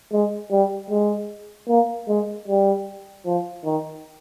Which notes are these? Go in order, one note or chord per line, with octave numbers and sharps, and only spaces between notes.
G#3
G3
G#3
A#3
G#3
G3
F3
D#3